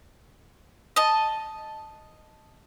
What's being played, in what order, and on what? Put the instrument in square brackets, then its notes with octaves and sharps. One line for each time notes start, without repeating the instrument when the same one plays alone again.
[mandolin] D#5 A5